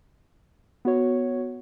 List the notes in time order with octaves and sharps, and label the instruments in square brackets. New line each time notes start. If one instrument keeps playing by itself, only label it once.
[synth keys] B3 F#4 C#5